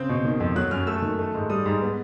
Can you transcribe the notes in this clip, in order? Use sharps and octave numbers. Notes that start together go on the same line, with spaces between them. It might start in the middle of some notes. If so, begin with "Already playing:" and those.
Already playing: C#3 C4 G6
B2
D#3
F2
F#3 F#6
F#2 F6
A3 E6
D#3
A3
G#2
G3 D#6
G#2
B3